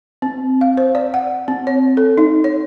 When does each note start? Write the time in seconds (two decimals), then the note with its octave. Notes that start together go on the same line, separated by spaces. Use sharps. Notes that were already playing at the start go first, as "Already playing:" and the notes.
0.22 C4
0.61 F5
0.77 C5
0.95 D5
1.14 F#5
1.48 C4
1.67 C#5
1.97 A4
2.17 D#4
2.44 C#5